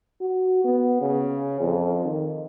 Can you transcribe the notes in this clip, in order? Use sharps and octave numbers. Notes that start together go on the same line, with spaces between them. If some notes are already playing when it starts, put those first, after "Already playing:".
F#4
B3
C#3
F2
D#3